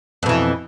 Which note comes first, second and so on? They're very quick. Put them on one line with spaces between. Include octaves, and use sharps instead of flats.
F2 B2 E3